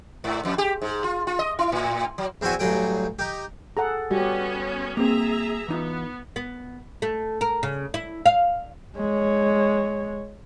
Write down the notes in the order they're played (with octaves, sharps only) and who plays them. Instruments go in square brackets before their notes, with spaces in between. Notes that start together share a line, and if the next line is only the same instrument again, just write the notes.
[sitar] G#2
F2
G4
G#2
F4
F4
D#5
E4
A2
F#3
[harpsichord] E2 C4 E4 F#4 G#5
A1 G2 F#3 G#4 G5
D#4 G4
[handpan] G#4 A4 F#5 [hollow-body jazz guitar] A#5
[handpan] G3 F#4 G4 [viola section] B3 C#4
[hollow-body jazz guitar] A#3 C4 [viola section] G#4 E5 A#5
[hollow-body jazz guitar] E3 D#4 F4 [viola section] B3
[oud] B3
A3
A#4
C#3
E4
F5
[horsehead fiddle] G#3 C#5